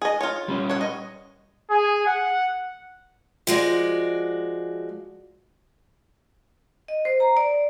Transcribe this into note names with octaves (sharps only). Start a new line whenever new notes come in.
G#4 D#5
F4 C#5
G3 C#4
C#5 F#5
D#5
G#4
F#5
F3 G#3 F#4 D5
D#5
C5
A#5
D5